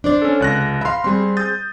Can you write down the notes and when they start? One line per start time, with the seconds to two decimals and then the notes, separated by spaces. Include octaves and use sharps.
0.04 D4 C5 D5
0.22 C#4 A4
0.40 C#2 C3 F#6 A#6
0.81 E5 F5 B5 C6
1.04 G3 C4 G#4 C6
1.37 D#6 G6 A6